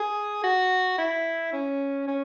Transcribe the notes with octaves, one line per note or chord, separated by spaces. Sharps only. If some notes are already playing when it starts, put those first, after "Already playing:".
Already playing: G#4
F#4
E4
C#4
C#4